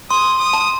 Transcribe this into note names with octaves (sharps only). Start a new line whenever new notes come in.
C6 D#6
D#6
A5